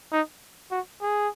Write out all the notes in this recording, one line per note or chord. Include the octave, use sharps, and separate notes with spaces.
D#4
F#4
G#4